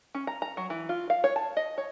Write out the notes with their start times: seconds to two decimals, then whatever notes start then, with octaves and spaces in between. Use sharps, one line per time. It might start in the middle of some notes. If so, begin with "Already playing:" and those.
0.15 C#4
0.27 A#5
0.42 A#5
0.57 F#3
0.70 E3
0.89 F4
1.10 F5
1.24 C#5
1.36 A5
1.57 D#5
1.78 C#5